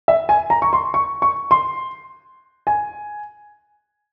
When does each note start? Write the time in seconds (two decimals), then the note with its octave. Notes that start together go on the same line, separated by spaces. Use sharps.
0.08 E5
0.29 G#5
0.50 A#5
0.62 C#6
0.73 C6
0.94 C#6
1.22 C#6
1.51 C6
2.67 G#5